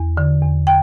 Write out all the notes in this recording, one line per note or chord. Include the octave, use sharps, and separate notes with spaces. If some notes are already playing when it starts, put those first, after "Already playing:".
Already playing: E2
D3
E2
G5